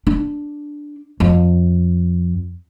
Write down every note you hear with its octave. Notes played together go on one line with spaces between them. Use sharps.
D4
F2